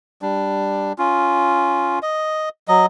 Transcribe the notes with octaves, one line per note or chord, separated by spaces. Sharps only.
G3 D4
C#4 F4
D#5
F#3 D#5